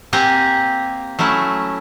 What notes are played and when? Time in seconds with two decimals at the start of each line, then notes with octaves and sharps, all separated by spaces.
0.13 A#3 C4 G4 F#5 G#5 A#5
1.19 F#3 A3 C#4 E4 F#5